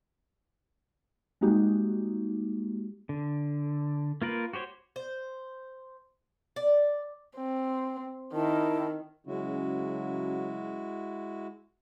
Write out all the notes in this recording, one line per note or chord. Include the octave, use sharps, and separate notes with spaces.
G3 G#3 A#3 D#4 F#4 G4
D3
A#3 F4 A#4 B4
F#4 G4 C5 C#5
C5
D5
C4
D#3 E4 A#4 A5
C#3 F#3 G#3 C#4 E4 F#4